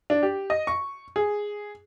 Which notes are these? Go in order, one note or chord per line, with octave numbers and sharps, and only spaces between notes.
D4
G4
D#5
C#6
G#4